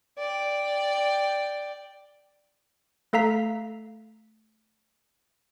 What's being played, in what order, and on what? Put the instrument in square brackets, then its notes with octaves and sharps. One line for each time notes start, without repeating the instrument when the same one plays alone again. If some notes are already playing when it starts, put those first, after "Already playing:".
[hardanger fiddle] D5 G5
[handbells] A3 A4 F5 A#5 B6